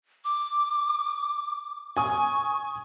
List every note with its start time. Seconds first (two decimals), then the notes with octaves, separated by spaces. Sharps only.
0.25 D6
1.97 G#5 C#6 D#6